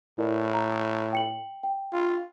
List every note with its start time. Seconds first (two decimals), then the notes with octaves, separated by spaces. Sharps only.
0.18 A2 E4 A#4 D5
0.54 A#5
1.13 G5 C#7 F#7
1.63 G5
1.93 F4